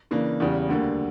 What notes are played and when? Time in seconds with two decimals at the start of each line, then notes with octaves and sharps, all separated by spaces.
0.11 C#3 E3 A#3 D4
0.40 E2 C#3 G3
0.69 D2 D3 G3 A#3